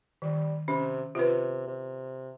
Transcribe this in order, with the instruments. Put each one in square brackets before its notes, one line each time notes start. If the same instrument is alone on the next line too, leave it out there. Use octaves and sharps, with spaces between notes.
[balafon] D#3 [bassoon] G3
[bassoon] C3 [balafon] C#4
[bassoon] C3 [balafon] F4 B4
[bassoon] C3